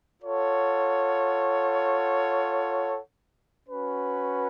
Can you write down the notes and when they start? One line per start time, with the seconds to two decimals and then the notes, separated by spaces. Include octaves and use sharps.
0.21 F4 A4 C#5 F#5
3.69 C#4 F#4 B4